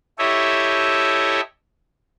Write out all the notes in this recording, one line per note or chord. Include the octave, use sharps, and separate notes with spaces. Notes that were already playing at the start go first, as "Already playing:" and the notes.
E4 G4 A4 C#5 D#5 E5